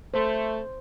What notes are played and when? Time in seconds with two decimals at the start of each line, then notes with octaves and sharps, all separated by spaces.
0.14 A3 C5